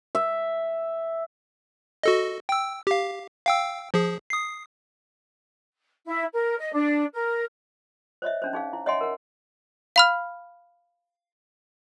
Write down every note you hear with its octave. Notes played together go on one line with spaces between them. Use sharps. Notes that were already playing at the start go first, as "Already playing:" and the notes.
E5
F#4 A4 D#5
G5 E6
G4 F5
F5 G5 E6
F3 G#4
D#6 C7
E4
A#4
D#5
D4
A#4
C5 C#5 D#5 E5
C#4 D4 C5
D#4 G#4 F5
E4
C#5 D#5 E5 F#5 G#5 C6
A#4 F#5
F5 B5 F6